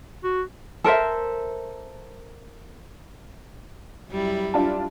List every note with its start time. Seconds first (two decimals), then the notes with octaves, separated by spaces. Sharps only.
0.24 F#4
0.84 A4 A#4 C5 E5
4.10 F#2 G3 E4
4.54 D4 F4 A5